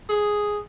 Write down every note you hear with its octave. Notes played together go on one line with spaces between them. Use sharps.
G#4